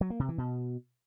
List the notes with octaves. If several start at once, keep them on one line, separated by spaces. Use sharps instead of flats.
F#3
A#3
C3
E3
B2